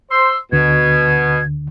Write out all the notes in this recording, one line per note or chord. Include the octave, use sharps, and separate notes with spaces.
C5 C6 E6
D2 B2 D3 G#6